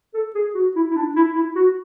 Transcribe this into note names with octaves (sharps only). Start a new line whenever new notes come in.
A4
G#4
F#4
E4
E4
D4
E4
E4
F#4